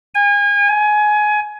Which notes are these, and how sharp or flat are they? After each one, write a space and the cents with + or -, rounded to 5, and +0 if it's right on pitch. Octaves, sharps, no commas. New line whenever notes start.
G#5 -35
G#5 +20